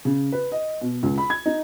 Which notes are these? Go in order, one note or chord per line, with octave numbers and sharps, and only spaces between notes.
C#3
B4
D#5
B2
C#2
B5
G#6
D#4